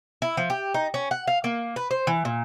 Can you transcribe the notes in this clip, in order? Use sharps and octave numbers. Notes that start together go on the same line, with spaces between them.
E4
F3
G4
D#4
C#4
F#5
F5
A#3
B4
C5
E3
A#2